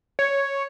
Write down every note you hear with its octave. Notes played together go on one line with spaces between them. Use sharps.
C#5